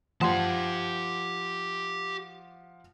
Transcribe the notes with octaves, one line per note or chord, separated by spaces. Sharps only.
F3 G4 F#5 A5 C6